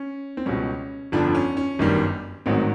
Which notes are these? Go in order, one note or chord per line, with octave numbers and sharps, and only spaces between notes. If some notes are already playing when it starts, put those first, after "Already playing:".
Already playing: C#4
C4
C#2 B2 G3 C#4
G1 F2 D3 F3 D4
C#4
C#4
G1 F#2 D#3 G3
A1 G#2 D#3 F#3 C4